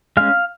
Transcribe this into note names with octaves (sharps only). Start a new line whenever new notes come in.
G#3 C#4 F5